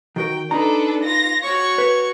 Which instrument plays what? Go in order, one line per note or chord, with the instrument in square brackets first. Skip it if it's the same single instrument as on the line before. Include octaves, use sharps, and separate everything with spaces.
[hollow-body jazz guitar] D#3 F#4 A#4 [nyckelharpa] G5
[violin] D4 A4 [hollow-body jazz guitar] D#4 A#5 [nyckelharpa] B4
[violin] F4 A#6
[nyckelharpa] F#4 C#6 [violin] C#5
[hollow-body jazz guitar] B4